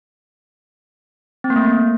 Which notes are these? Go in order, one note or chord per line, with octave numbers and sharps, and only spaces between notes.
C4
A#3
A3